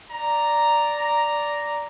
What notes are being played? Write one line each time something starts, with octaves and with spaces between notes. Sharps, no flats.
D5 A#5